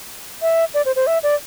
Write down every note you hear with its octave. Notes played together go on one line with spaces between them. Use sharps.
E5
D5
C5
C5
E5
D5